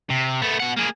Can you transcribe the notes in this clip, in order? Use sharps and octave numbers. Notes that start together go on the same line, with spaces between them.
C3
A3 B3
B2 F#5
A#3 G#4